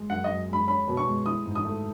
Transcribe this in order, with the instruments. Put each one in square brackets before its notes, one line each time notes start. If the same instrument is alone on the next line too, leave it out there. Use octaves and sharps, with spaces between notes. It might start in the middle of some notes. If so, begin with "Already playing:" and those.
Already playing: [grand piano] G#3
[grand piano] F#2 [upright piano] F#5
[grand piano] F#2 [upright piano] D#5
[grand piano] G#3 [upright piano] B5
[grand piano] C#4 [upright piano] B5
[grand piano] B2
[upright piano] C#6
[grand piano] G#3
[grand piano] E4 [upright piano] D#6
[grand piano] G#2
[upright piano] D#6
[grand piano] A3